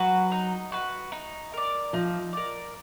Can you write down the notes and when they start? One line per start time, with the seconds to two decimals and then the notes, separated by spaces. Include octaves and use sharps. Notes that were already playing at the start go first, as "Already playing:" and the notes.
Already playing: F#3 F#4 B4
0.32 D#4
0.72 F#4 B4
1.12 D#4
1.53 A#4 D5
1.93 F3 D#4
2.33 A#4 D5